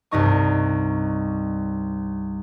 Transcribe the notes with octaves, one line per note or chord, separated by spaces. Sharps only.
C2 G2 D#4 C#6